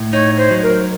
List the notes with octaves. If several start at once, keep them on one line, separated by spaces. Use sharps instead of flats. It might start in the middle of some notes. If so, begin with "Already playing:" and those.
Already playing: A2
D#4 C#5
C5
F#3
A#4